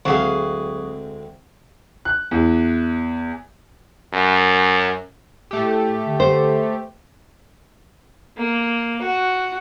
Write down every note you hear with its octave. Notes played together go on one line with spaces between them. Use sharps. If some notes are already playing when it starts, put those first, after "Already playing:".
D2 F#3 G#3 C4 G#4 F5 G5
F#6
E2
F#2
A2 A3 G4
D3
C5
A#3
F#4